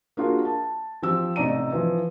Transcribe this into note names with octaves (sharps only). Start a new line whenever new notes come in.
A#3 D4 F4 F#4 G#4 A#4
A5
F3 C4 G4 E6
A1 C3 D#4 D5 A#5 D#7
E3 F3